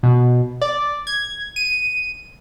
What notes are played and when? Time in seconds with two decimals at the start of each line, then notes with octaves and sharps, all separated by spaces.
0.03 B2
0.62 D5
1.07 G#6
1.56 D#7